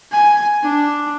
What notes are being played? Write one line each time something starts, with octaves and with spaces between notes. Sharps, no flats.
G#5
D4